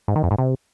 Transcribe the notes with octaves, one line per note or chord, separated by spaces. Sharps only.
G#2
D#3
F2
G#2
C3